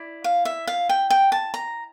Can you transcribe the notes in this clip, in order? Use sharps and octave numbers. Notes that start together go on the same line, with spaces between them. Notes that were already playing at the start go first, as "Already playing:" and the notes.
Already playing: E4 D5
F5
E5
F5
G5
G5
A5
A#5